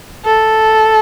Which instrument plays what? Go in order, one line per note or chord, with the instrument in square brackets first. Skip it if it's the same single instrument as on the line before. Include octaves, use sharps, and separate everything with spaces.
[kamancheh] A4